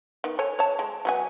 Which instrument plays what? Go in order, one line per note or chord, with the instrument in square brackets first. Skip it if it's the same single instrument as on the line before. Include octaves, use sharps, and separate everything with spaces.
[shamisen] D#3 B3
A4 C#5 G#5
C#5 A5
G#3
F#3 B3 G#5